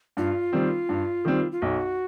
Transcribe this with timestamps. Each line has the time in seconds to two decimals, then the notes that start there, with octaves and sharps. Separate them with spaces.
0.17 G2 F4
0.53 D#3 G3 C4
0.89 G2
1.25 D#3 G3 C4
1.52 F4
1.62 B1 F#4